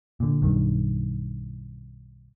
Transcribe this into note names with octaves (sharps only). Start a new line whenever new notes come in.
A#2 D3
B1 G2 D#3